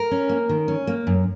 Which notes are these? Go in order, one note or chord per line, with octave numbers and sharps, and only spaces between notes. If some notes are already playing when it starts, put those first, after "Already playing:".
Already playing: A#4
C#4
A#3
D#3
C#4
A#3
F#2